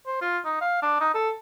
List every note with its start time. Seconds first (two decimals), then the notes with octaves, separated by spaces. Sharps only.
0.06 C5
0.21 F4
0.45 D#4
0.61 F5
0.82 D4
1.00 D#4
1.14 A4